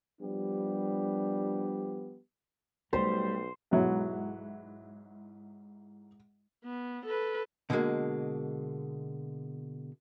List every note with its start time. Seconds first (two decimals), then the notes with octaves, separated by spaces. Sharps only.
0.21 F3 G3 B3 D4 G4
2.93 B1 F#3 G3 A3 C5
3.71 B1 G#2 F#3 E4
6.64 B3
7.05 A4 B4
7.70 B2 D3 F3 G3 G#3 A#3